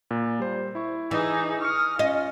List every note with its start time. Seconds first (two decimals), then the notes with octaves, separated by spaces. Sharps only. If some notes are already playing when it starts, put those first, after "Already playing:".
0.11 A#2
0.39 G3 C5
0.75 E4 C#6
1.11 E3 D#4 G#4
1.61 C#6 D#6 F6 C#7
1.99 C#4 F4 D#5